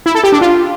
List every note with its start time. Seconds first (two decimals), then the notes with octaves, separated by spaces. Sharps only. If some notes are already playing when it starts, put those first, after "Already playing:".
0.06 E4
0.15 A4
0.24 G4
0.32 D4
0.41 F4